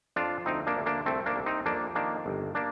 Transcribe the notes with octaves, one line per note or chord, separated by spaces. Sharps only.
F2 D4 F4
D2 C4 D#4
A#3 D4
D2
A#3 D4
C2 A3 C4
A#3 D4
C2
C4 D#4
F2 A#3 D4
D#3 A#3 D4
G1
A#3 D4